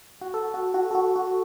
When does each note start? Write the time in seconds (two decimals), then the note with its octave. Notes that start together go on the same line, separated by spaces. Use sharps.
0.21 F#4
0.34 A4
0.54 F#4
0.74 F#4
0.91 A4
0.95 F#4
1.16 F#4